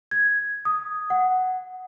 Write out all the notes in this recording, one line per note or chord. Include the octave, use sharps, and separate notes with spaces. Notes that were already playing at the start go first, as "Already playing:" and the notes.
G#6
D#6
F#5